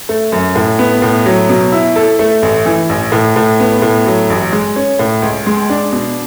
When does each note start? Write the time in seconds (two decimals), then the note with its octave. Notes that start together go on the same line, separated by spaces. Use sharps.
0.09 A3
0.32 F#2
0.56 A2
0.79 B3
1.02 A2
1.26 F#3
1.49 B2
1.72 E4
1.96 A4
2.19 A3
2.42 A1
2.66 E3
2.89 A1
3.12 A2
3.36 A2
3.60 B3
3.82 A2
4.06 F#3
4.30 A1
4.52 G#3
4.76 C#4
4.99 A2
5.22 C#2
5.47 G#3
5.69 D4
5.92 B2